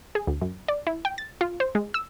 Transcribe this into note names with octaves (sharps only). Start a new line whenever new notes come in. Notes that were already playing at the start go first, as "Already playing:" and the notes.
G#4
D2
F#2
D5
E4
G5
A6
F4
C5
G#3
E6